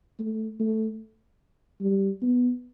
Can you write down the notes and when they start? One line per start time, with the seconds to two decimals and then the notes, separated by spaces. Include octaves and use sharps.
0.19 A3
0.60 A3
1.81 G3
2.22 B3